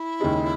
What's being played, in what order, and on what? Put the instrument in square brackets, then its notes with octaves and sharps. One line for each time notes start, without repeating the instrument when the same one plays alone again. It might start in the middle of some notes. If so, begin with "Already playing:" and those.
Already playing: [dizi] E4
[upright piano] D#2 C#3 G#3 D#4